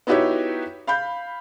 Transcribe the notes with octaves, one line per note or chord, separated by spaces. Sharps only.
B3 D#4 E4 F#4 G4 C#5
F5 B5 G6